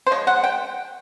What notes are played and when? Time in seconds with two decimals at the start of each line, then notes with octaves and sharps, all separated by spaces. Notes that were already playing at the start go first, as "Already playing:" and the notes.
0.07 C5
0.11 F3 G#3 C#5
0.27 F#5
0.44 G5